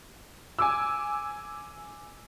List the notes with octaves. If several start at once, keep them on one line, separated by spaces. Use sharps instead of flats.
G#5 D6 E6